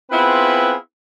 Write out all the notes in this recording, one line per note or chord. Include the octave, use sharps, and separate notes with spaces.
B3 C4 E4 F4 G#4 B4